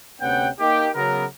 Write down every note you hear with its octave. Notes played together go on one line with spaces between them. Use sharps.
D2 C3 B3 C#4 F#5 G5
A#3 D#4 G4
C#3 F#3 B3 A#4